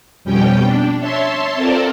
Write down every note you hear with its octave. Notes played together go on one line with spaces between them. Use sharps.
F2 B2 G3 C#4 G5
D4
C#5 E5 A5 C6
C4 F4 A4 A#4 C5 D5